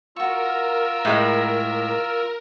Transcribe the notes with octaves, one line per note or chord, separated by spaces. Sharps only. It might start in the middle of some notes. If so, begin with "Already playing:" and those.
F4 F#4 A#4 C#6 E6
A2 G#3